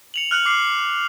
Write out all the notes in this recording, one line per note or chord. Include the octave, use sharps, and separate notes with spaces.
C#7 F7 F#7
F6 F#6 C#7 F#7
D6 C7